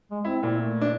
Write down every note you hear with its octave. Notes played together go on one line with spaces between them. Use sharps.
G#3
C4 E4
A#2 E4
A3
D4